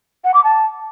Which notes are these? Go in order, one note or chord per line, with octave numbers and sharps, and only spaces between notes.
F#5
D6
A5